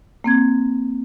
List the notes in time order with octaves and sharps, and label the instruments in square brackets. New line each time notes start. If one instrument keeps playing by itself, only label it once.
[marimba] A#3 C4 G#6